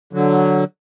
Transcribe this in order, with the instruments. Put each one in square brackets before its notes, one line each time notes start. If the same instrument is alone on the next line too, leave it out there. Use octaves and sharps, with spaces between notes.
[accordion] D3 F#3